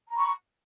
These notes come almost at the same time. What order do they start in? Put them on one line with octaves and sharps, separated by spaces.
A#5 B5 C#6